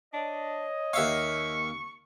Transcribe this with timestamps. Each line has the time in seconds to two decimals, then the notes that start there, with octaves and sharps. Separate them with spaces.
0.13 D4 C#5 D#5
0.93 D#2 E5 F5 C#6